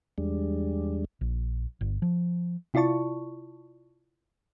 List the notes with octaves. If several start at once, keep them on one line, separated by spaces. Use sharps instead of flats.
E2 G3 G#3 D4
A#1
G1
F3
C3 E4 F4 D5 A5 C#6